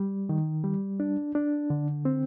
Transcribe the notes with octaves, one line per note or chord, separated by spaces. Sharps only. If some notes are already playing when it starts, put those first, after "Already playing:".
Already playing: G3
D#3
G3
D4
D4
D3
C4